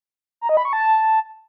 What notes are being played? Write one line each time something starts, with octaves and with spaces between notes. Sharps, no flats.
A#5
D#5
B5
C#6
A5